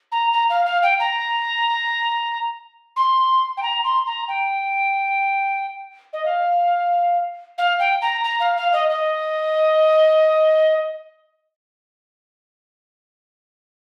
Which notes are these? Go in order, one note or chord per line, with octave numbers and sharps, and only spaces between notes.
A#5
A#5
F5
F5
G5
A#5
C6
G5
A#5
C6
A#5
G5
D#5
F5
F5
G5
A#5
A#5
F5
F5
D#5
D#5